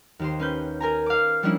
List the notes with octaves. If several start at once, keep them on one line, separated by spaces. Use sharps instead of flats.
D#2 G4 C5
C#4 B4 G6
A#4 G#5 A#5
F5 D6
F3 G3 A#3 C#4 D4 E4